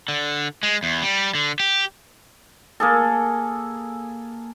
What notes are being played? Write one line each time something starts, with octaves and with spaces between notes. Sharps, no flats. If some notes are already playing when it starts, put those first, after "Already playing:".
D3
G#3
E2
G3
D3
G4
A#3 G#4 A4